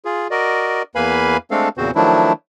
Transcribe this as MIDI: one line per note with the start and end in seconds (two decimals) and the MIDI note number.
0.05 0.28 65
0.05 0.28 68
0.31 0.82 66
0.31 0.82 70
0.31 0.82 74
0.31 0.82 75
0.95 1.37 40
0.95 1.37 58
0.95 1.37 71
0.95 1.37 77
0.95 1.37 80
0.95 1.37 83
1.51 1.69 56
1.51 1.69 57
1.51 1.69 60
1.51 1.69 62
1.51 1.69 69
1.51 1.69 77
1.77 1.91 40
1.77 1.91 46
1.77 1.91 49
1.77 1.91 60
1.77 1.91 66
1.77 1.91 72
1.95 2.33 51
1.95 2.33 53
1.95 2.33 54
1.95 2.33 57
1.95 2.33 62
1.95 2.33 64